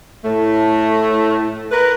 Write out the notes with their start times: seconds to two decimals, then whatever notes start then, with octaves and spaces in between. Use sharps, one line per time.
0.25 A2 A3
1.72 A#4 B4